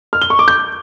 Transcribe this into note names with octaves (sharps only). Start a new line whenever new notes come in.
F6
G7
C#6
D6
G6